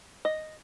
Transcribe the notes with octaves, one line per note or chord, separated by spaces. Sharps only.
D#5